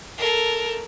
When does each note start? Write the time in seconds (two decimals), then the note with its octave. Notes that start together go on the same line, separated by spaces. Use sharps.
0.18 A4 A#4